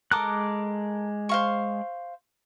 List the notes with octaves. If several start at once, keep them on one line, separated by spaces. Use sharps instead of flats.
G#3 A4 A#4 D6 D#6 F#6
C5 F5 C#6